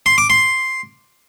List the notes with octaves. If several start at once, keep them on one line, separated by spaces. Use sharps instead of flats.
C6
D6
C6